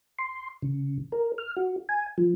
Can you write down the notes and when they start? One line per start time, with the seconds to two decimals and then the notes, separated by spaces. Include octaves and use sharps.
0.19 C6
0.62 C#3
1.12 A#4
1.38 F6
1.57 F#4
1.89 G#5
2.18 F3